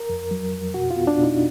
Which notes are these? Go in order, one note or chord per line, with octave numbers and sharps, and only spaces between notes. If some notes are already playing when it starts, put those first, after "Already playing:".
Already playing: A#4
F2
F#3
F2
B2 F#4
F4
B3
D4
B2
D#4